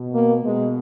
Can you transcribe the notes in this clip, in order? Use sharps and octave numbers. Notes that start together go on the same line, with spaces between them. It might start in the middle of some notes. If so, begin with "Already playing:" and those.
Already playing: B2
A#3
B2 G#3